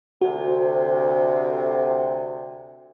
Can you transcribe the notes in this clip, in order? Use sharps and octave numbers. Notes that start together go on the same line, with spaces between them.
D2 C3 F#4